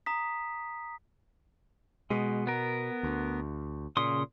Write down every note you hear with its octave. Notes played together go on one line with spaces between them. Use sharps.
A#5 D#6 B6
B2 G#3
B3 A#4
D2
A#2 C#3 C6 D#6